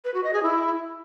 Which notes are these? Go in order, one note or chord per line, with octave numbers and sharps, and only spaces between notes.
B4
F#4
D#5
G#4
E4